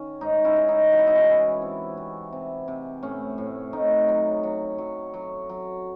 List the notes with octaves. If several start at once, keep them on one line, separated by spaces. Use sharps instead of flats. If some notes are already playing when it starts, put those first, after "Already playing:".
Already playing: D#3 C#4
G#2 D#4
C#4 E4
G#3
D#4
E3 F#4
E4
D#4
C#4 E4
E3
C3
C3
C3
C3
A2 C#4
A2
A2 D#4
F#3
F#3
F#3
F#3
F#3